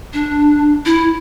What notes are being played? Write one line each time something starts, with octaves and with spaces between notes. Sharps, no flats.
D4
E4